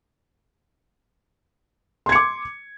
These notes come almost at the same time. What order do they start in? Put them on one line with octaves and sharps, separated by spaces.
C6 G#6 C#7 D6